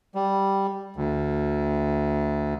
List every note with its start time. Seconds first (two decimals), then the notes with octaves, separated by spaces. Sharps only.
0.15 G3
0.96 D2